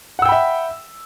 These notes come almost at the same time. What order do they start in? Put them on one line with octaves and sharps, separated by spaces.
F#5 E6 G5 B5 E5